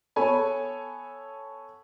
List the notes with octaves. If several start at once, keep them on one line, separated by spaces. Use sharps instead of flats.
B3 A4 C#5 G#5 B5